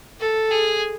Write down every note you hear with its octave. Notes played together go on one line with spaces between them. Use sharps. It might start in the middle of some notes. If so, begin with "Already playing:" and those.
A4
G#4